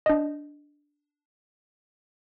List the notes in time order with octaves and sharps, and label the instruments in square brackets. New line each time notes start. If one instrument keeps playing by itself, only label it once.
[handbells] D4 D#5